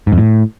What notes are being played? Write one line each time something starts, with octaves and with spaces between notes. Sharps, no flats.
G#2
F2
A2